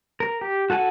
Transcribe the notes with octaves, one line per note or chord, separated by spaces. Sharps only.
A#4
G4
F#4 A4 F#5 G#5